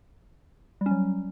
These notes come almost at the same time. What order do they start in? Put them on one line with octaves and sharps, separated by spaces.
G3 C#4 F#3